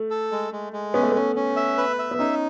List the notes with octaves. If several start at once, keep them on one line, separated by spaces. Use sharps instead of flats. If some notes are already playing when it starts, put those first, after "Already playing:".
Already playing: A3
A4
G#3
G#3
G#3
B3 C#4
A3
B3 C#4
C#4
E5
B4
E5
B3
C#4 D#4